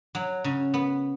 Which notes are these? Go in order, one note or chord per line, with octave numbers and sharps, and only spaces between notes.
F#3
C#3
B3